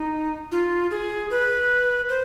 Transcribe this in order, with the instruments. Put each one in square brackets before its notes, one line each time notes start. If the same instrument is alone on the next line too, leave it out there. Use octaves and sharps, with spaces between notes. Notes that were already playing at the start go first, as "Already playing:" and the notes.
Already playing: [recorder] D#4
F4
G#4
B4
C5